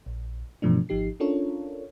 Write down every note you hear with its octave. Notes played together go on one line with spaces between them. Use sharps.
A#1
G2 B2 E3 F3 A3 D4
G#1 F3 D#4 G4 C7
C#4 D4 F4 A4 A#4 C#5